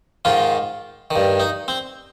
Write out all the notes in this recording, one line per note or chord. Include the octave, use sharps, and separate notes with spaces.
G#2 D#3 F4
G2 D#3
D#4
C4